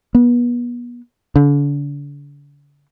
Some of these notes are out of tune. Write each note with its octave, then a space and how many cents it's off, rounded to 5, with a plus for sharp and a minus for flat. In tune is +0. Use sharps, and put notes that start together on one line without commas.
B3 -35
D3 -40